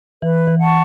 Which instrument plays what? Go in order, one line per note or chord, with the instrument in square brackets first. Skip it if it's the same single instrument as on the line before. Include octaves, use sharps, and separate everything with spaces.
[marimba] E3 [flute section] B4
[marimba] E3
[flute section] F#5 A5 C#6